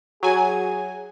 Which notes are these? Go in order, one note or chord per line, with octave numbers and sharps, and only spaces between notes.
F#3 G#4 G#5